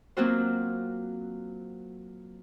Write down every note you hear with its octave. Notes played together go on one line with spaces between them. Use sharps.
F#3 A#3 C4 F4 F#4 C5